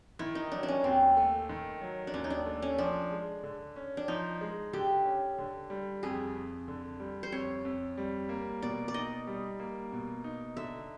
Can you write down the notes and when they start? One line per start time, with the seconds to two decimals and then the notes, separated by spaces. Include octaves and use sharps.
0.19 D#3 E4
0.35 D#4
0.52 F#3 D4
0.63 D4
0.68 C#4
0.84 D#2 C4
1.17 A3
1.49 D#3
1.82 F#3
2.07 D4
2.14 D#2 C#4
2.24 D#4
2.30 D4
2.46 A3
2.62 C#4
2.78 F3 D4
3.11 G#3
3.43 D3
3.76 C#4
3.97 D4
4.08 F3 D#4
4.41 G#3
4.73 D3 G4
5.06 C#4
5.38 D3
5.70 G3
6.03 F2 G#4
6.36 F2
6.68 D3
7.00 G3
7.23 C5
7.32 F2 C#5
7.65 F2
7.98 G3
8.29 A#3
8.62 B2 D5
8.88 D5
8.94 D#4 D#5
9.27 G3
9.60 A#3
9.92 B2
10.24 D#4
10.57 D3 E5